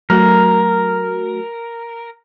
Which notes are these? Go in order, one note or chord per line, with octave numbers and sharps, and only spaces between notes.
F#3 A3 F#4 A#4